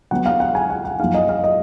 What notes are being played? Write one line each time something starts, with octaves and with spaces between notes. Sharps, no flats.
D3 F#3 B3 F#5
F5
F#5
G#5
F#5
F#5
F#2 F3 A#3 D#4 F5
D#5
F5
D#5